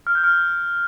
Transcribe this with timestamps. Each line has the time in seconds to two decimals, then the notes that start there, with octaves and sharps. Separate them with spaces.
0.07 F6
0.15 G6
0.24 F6